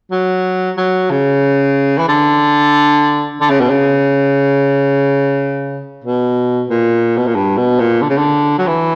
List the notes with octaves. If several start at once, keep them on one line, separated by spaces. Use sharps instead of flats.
F#3
F#3
C#3
E3
D3
D3
C#3
B2
C#3
B2
A#2
B2
A#2
G2
B2
A#2
D3
C#3
D3
F#3
E3